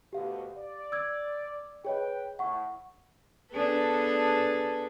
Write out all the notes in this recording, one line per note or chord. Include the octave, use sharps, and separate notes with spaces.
D2 B2 G4 F5
D5
E6 G#6
G#4 B4 C#5 D#5 G5
A2 E4 F#5 C#6
B3 D4 G#4 A4 B4